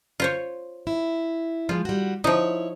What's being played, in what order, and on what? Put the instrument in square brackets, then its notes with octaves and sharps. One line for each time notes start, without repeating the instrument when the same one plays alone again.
[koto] F4 C5 C#5
[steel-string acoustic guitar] E4
[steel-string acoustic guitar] F3 G#3 [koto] F4
[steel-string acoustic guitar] G3 F#4
[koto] F3 D#4 [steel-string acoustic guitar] E4 C#5